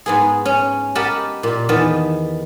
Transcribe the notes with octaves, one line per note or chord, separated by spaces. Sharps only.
G#2 B3 G#4
C#4
G4 A#4 D#5 F#5 A5 B5
A#2 G4
E2 D#3 B3 A5